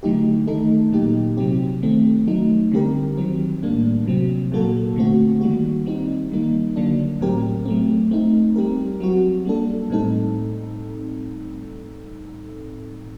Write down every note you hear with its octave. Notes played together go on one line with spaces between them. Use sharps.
D3 F#3 A3 D#4 G4
D#3 A3 D#4 A4
A#2 F#3 A#3 D#4 G4
C3 F#3 C4 G4
D#3 A3 C4
F#3 A3 D#4
D3 G3 C4 G4 A#4
D#3 F#3 C4
A2 G3 A#3 D4
C3 F#3 C4
A#2 F#3 A#3 F#4 A4
D3 A3 C4 F#4
D#3 G3 A#3 F#4
G3 C4 D#4
D#3 G3 A#3 D#4
D3 F#3 A#3 D4
A2 F#3 C4 G4 A#4
F#3 A3 C4
A3 C4 D#4
G3 C4 G4 A#4
F#3 C4 F#4
G3 A#3 D4 A4
A2 G3 C4 D#4 A4